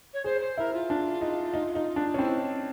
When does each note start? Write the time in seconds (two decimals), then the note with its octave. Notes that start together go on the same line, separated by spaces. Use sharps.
0.13 C#5
0.24 G#4 C5
0.41 C5
0.57 E4 A#4
0.74 F4
0.90 D4
1.21 D#4
1.54 D#4
1.75 D#4
1.96 D4
2.14 C#4
2.18 C4 E4